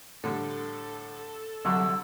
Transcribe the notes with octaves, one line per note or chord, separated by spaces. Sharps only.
A2 D3 G3 A4
C2 D3 F#3 D4 E5 C#6 E6